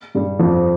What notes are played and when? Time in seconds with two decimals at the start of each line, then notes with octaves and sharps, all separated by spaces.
0.15 G2 G3
0.39 F2 F3